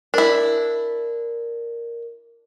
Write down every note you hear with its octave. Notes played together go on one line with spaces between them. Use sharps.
D4 E4 A#4